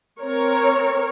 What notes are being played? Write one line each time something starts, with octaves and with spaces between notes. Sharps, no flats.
C4 A#4 C#5